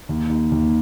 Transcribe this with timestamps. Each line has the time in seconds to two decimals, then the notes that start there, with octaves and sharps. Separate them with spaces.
0.09 D#2
0.29 D#2
0.52 D#2